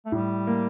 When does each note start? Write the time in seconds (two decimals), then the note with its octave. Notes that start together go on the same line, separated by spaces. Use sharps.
0.06 A3
0.12 A2 G3
0.47 A#3